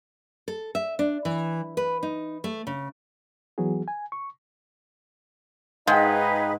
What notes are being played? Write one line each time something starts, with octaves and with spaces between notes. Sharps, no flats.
A4
E5
D4
E3
B4
D#4
A3
C#3
E3 F#3 B3 F#4 G#4
G#5
C#6
G#2 D#4 G#4 B4 D#5 F5 G5